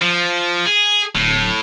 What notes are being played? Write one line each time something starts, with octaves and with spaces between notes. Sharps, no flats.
F3
G#4
D1 A2